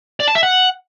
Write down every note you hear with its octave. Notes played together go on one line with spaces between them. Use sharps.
D5
A5
E5
F#5